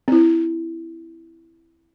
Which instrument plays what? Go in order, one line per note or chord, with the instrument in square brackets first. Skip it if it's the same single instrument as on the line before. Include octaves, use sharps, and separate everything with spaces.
[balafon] C4 E4